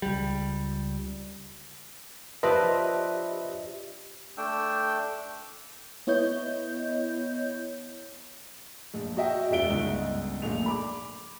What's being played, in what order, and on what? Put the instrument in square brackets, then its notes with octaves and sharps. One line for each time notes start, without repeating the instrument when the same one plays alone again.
[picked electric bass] C#2 G3
[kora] F3 D4 F4 [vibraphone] G4 [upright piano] B4 [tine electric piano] D#5 E5
[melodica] A3 D4 G5 E6
[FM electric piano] B3 E4 C#5 D#5 G6
[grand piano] A#1
F#4 D#5 E5 G5
E1 G#3 F4 E5 D7 G7
G1 C#2 G#2 D#4 G7
A#1 A#2 A3 F7
B5 D6